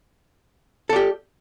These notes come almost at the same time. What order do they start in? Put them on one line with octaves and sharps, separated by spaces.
A4 D5 G4